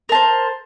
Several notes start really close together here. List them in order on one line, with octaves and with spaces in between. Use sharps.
A#4 A5 C5